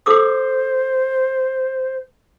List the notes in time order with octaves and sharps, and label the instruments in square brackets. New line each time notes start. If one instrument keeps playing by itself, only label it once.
[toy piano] A4 D6 E6 [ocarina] C5